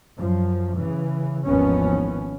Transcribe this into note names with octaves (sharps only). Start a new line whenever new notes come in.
F#2 F3
C#3 E3
G#1 D#2 E3 F3 B3 C#4